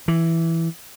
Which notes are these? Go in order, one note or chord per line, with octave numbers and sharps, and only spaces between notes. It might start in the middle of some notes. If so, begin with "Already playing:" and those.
E3